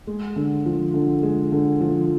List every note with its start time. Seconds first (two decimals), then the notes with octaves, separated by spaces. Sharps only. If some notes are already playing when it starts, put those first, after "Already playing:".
0.07 G#3
0.36 D3
0.66 F3
0.94 D3
1.23 G#3
1.52 D3
1.81 F3